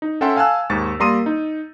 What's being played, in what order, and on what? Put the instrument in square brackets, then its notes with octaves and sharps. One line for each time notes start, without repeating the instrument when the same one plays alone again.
[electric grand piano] D#4
C#4 A4 E5 F#5 G5 C6
F5 G#5 A5 E6 F#6
D#2 G#2 C#6 A6
G3 A#3 A#5 C6 D#6 D#7
D#4